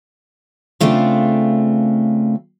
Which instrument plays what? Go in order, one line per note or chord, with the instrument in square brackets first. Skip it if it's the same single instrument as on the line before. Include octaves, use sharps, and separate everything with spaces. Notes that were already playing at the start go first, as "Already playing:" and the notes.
[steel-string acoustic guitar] C#3 A3 C4 D4 F4